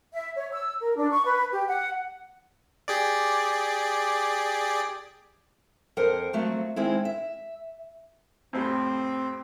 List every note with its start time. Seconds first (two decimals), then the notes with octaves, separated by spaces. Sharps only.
0.13 E5
0.36 C#5
0.53 E6
0.80 A#4
0.97 D4
1.11 C#6
1.25 B4
1.52 G4
1.68 F#5
2.88 G4 G#4 D5
5.97 F2 A#4 C5 F#5
6.33 F3 F#3 A3 C4
6.76 D#3 G#3 C4 E4
7.05 E5
8.53 F2 A2 G3 C4